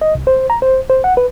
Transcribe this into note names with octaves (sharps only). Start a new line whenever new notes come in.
D#5
C2
C5
A#5
C5
C5
F#5
B4